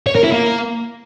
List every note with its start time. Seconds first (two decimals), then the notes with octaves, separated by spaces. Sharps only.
0.07 C#5
0.15 A#4
0.24 E4
0.32 A#3